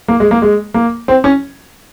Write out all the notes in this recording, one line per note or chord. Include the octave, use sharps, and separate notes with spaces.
A#3
G#3
A#3
G#3
A#3
C4
C#4